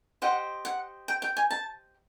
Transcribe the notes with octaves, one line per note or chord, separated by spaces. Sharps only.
G4 C5 D#5 F#5
F#5
G5
G5
G#5
A5